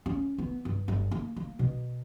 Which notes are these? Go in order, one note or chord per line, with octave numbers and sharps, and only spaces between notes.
C#4
B3
G2
G1
A#3
A#3
B2